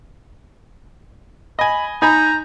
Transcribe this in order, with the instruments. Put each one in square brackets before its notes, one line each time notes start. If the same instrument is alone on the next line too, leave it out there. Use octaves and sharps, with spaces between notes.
[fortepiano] D#5 G#5 [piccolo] B5
[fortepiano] D#4 G#5 B5 [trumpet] A#5 [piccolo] G6